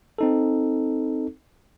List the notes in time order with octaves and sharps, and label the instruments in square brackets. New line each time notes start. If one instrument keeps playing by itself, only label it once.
[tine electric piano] C4 D#4 A4